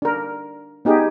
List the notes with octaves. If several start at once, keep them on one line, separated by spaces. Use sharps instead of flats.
D4 A#4
B3 D#4 G4 G#4